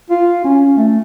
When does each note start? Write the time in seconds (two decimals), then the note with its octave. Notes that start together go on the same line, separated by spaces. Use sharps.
0.10 F4
0.44 C#4
0.77 A3